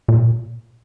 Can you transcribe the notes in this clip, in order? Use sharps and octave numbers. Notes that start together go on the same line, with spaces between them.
A#2